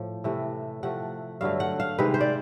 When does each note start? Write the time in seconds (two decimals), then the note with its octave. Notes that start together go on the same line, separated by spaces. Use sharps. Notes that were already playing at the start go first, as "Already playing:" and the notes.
Already playing: A2 F3
0.24 C3 E3 A3
0.83 C3 F3 A3 F#5
1.41 G2 D3 F#3 A3 F5
1.60 F#5
1.80 F5
1.98 C3 D#3 G#3 B4
2.14 C5
2.21 D5